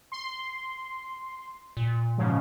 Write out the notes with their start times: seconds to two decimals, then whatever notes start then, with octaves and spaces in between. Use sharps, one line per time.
0.12 C6
1.77 A#2
2.18 G#2 C#3 F3